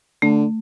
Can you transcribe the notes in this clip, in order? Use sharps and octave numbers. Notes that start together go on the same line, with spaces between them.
D3 A3